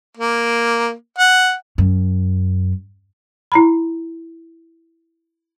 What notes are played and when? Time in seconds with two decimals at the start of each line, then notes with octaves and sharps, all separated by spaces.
0.17 A#3
1.18 F#5
1.78 F#2
3.52 E4 A#5 B5